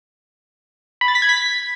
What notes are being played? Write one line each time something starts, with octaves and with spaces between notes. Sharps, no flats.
B5
A6
B6
G#6
B6